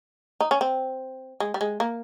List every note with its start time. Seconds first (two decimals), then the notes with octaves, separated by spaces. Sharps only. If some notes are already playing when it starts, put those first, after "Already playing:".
0.41 D#4
0.51 C#4
0.61 C4
1.40 G#3
1.54 G3
1.61 G#3
1.80 A#3